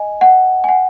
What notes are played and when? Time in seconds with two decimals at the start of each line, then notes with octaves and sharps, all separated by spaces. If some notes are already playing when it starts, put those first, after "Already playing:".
Already playing: D#5 G#5
0.21 F#5
0.64 G#5
0.69 F#5